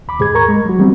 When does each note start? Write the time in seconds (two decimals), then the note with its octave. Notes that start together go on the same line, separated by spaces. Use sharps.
0.08 D#2 B5 D6
0.19 D#2 G#2 G#4 G#6
0.35 A#4 A#5 C#6 G#6
0.48 G#3
0.66 F#3 F#4
0.79 E3 G3 B3 C4